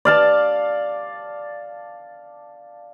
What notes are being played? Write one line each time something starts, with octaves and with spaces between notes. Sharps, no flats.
D5 F5 A5